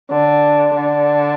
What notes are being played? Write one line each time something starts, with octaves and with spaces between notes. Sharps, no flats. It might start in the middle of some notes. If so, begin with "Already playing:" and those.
D3
D3